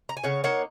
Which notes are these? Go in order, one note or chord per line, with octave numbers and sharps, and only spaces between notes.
A#5
G#5
C#3 C#5 F#5
A#3 D#4 C#5 F#5